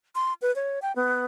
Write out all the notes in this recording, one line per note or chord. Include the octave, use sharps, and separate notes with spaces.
C6
B4
C#5
G5
B3